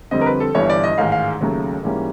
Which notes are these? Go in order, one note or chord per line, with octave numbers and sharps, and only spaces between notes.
F2 D3 G3 C4 D#5
A#4
B4
A4
G1 G2 E3 C#5
D5
D#5
A1 G#2 D#3 G#3 F5
F5
D#2 C#3 F#3 A3
G#2 E3 G3 A#3 C#4